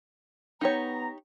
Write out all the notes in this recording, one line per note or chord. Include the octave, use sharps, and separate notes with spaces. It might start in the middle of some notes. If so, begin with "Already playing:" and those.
B3 D#4 G4 C#5 A#5